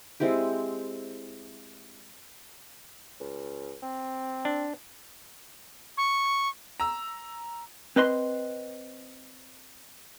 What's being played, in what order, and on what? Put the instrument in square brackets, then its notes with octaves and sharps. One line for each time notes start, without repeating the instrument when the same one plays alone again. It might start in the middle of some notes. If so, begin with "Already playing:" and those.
[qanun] G#3 C4 E4 G4
[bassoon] C#2
C4
[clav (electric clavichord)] D4
[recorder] C#6
[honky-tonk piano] A#5 E6
[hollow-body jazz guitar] C4 B4 D#5 C6